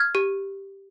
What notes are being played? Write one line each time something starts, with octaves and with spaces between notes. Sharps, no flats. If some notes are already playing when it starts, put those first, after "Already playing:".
Already playing: F6 G#6
G4